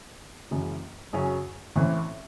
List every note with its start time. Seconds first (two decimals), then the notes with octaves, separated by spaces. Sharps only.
0.51 F#1 F#2 E3 G#3
1.13 F#2 C#3 F#3 C#4
1.76 A1 A2 E3 C4